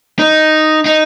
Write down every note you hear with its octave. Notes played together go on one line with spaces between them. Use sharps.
D#4
D#4